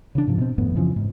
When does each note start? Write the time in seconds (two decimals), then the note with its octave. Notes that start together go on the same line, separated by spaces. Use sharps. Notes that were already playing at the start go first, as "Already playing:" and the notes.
0.15 C#3 E3 D4
0.27 G#2 C3 F3
0.38 B2 C4
0.58 G#1 F2 A2 B3
0.76 F2 C#3 E3 F3
0.96 G#2